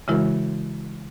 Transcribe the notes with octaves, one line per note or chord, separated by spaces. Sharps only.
C#3 E3 G#3 E4 F#4 A#4